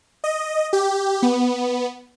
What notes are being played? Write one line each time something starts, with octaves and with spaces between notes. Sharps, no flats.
D#5
G4
B3